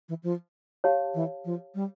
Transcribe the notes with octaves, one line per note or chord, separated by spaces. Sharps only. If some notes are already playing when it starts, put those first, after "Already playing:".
E3
F3
G4 C#5 F5 A5
E3
F3
G3